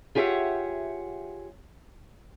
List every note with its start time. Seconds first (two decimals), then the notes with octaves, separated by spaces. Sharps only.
0.15 F4 G4 G#4 C#5 E5 F#5